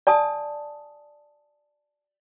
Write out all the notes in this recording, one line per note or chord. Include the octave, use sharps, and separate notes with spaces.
D5 G#5 A5 D#6